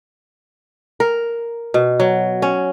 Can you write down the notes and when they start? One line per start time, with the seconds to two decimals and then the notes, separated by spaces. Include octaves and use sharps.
1.00 A#4
1.74 B2
2.00 F#3
2.42 C#4